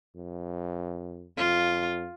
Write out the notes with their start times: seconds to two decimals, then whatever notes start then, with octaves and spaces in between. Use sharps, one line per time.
0.16 F2
1.37 F2 F4